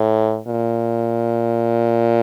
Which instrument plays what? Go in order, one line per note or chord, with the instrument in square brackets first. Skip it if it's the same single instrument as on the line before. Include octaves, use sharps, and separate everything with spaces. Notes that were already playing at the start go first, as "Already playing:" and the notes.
Already playing: [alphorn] A2
A#2